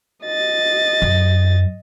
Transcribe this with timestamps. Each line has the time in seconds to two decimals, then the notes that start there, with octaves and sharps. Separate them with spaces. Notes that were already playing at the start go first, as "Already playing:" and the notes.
0.25 D#5 A6
1.02 F#2